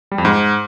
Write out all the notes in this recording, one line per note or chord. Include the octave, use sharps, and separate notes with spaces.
G3
F2
G#2